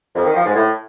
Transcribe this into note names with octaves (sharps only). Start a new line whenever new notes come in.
F2
D#3
F3
G#2
A2